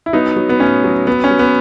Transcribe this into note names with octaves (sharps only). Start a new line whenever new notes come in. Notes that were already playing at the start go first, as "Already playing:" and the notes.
E4
F#3 B3 D#4
F#3
B3
A2 C#4
F#3
F#3 B3
C#4
F#3
B3